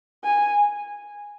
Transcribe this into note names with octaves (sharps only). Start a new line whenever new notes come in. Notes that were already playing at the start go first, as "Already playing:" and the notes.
G#5